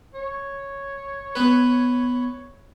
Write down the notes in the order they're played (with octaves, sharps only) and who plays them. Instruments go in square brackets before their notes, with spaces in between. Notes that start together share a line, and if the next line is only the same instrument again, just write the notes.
[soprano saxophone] C#5
[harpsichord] B3 B4